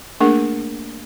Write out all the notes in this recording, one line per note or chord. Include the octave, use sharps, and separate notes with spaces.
A3 A#3 D4 G#4 A#4 F#5